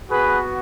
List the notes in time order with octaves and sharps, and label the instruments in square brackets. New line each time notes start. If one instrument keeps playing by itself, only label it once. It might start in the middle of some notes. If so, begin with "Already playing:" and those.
[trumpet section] B3 F#4 G#4 B4